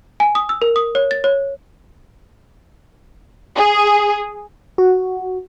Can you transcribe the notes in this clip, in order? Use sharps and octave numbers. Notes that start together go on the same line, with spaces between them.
G#5
D#6
E6
A#4
D#6
C#5
A6
C#5
G#4
F#4